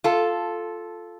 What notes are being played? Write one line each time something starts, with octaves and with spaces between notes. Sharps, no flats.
F4 A4